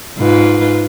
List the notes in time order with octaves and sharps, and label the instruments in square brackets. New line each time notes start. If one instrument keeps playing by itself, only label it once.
[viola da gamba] G#2 F4 B4